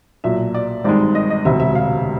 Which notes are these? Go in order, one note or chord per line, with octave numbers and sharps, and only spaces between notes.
B1 A#2 F#3 E5
D5
G#1 G2 D#3 G#3 D5
D#5
D#5
E1 D2 C3 E5
E5
F5